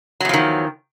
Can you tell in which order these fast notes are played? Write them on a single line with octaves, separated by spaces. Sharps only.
F#3 E2 F3 D#3